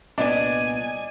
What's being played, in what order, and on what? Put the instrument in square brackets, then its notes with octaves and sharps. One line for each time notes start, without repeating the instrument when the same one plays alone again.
[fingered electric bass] C2 A#2 B3 [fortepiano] D4 [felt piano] D#5 [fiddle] G#5